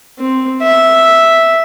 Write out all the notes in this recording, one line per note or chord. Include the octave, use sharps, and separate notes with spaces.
C4
E5